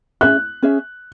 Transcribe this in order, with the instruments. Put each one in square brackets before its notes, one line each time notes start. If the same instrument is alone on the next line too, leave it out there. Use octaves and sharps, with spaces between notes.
[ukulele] C#4 G#4 E5 [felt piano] F#6
[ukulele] C#4 G#4 E5